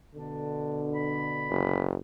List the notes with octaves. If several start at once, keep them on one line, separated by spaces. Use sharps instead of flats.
B2 D3 D4
B5
F#1